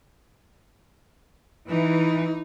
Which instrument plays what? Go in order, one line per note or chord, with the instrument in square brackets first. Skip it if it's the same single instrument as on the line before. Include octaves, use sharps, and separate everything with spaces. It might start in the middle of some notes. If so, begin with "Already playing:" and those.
[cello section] E3 [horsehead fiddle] D#4